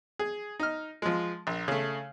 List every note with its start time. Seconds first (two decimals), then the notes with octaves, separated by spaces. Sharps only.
0.19 G#4
0.60 D#4 F6
1.02 F3 G#3
1.47 A#1
1.68 C#3 A3